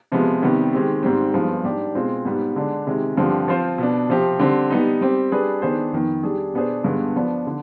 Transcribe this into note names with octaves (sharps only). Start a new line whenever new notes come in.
C3 F3 G#3 B3
C3 D#3 G3 B3
D#3 G#3 C4 G4
G#2 G3 C4
G2 F3 G#3 B3
G#2 G3 D4 G4
B2 G#3 C4 F4 C5
G#2 G3 B3
D3 G#3 D4
C3 D#3 G#3
G2 D3 F3 C4 G4
F3 C4 F4 C5
B2 B3 D4
C3 F3 C4 G4
D3 G3 C4
G3 B3 D#4
G3 C4 G4
G3 D4 G#4 B4
D#3 B3 D4 G#4 C5
F2 D#3 B3
G3 D4 G#4
B2 B3 D4 G#4 C5
G2 D3 G#3 B3
F3 B3 D4
D3